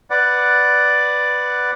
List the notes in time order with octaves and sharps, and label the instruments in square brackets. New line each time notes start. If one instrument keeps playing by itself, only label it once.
[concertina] B4 D5 F#5